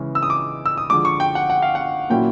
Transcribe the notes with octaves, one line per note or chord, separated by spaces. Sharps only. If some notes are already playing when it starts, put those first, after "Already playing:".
Already playing: C#3 E3 G#3 C#4 E4
E6
D#6
D6
E6
D#6
D3 F3 G#3 D6
C#6
G5
F#5
F#5
F5
F#5
A#2 F#3 A#3 C#4 E4 G5